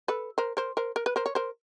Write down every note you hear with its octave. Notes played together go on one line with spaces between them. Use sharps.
A4 B4
A#4 C5
A#4 C5
A#4 C5
A#4
B4
A#4 C5
C#5
A#4 C5